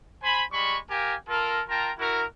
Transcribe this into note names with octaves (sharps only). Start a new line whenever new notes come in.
C5 G#5 B5
G3 G#3 B5 C#6
G4 A#4 F5 G5 G#5
F4 A4 A#4
F4 A#4 G5 A5 A#5
E4 F#4 A#4